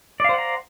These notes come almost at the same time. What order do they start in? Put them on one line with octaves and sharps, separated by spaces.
D5 F5 C5 F#5 A#5